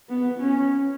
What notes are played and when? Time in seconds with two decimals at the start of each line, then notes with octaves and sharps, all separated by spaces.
0.09 B3
0.41 C#4